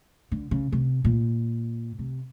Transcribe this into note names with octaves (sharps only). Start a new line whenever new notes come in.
D3
C#3
C3
A#2
C3